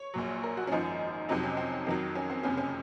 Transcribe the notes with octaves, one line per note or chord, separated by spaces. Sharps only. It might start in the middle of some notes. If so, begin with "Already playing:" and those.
Already playing: C#5
A#1 A#2 F#3
A#4
F#4
C#4
G#1 F#2 F3 D#4
F2 C3 F#3 D#4
C#4
C4
F2 D#3 F#3
C#4
C4
F#1 F2 C3 C#4
C#4